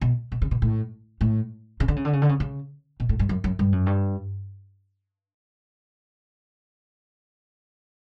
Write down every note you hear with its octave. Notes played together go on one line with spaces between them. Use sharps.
B2
B2
C#3
B2
A2
A2
C#3
D3
C#3
D3
C#3
D3
C#3
C#3
B2
A2
G2
F#2
F#2
G2
F#2
G2